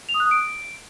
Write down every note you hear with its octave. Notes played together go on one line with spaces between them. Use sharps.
F7
D#6
F#6
D#6
D7